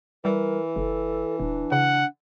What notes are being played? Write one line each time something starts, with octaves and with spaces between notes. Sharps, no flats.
E3 G3 A#4
F#1 A4
D#1 D4
C#3 F#5